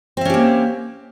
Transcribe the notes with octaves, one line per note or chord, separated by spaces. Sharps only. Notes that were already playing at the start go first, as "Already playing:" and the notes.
A#3 C4 C#4 G4 E5